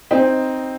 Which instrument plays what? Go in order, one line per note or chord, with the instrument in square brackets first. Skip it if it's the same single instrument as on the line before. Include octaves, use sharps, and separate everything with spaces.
[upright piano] C4 D#4